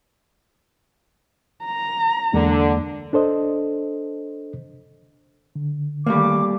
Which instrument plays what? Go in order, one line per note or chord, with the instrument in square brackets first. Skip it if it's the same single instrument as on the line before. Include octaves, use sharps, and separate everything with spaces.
[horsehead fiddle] A#5
[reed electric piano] E2 G#3 A#3 [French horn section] D3
[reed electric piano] D4 A4 C5 D#5
D3
[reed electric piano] D#3 [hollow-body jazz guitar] G3 A3 A#3 [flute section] D6